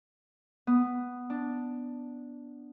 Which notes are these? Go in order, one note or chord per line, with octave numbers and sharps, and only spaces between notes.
B3
D4